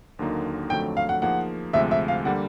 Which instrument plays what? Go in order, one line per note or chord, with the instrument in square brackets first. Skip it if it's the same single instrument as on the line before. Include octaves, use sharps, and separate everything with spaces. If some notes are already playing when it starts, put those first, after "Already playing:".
[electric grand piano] D#2 D3 F#3 A#3 D#4
[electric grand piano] F2 D3 F#3 A3 [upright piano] G5
[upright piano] F5
F#5
[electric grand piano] F3 A#3 D#4 G#4 [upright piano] F#5
[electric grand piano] D2 C3 F3 G#3 [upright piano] E5
[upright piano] E5
F5
[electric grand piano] D3 G3 A#3 [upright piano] F#5